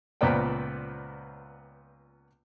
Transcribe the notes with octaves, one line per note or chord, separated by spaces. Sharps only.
C#2 A#2 B3 C5 D5 G5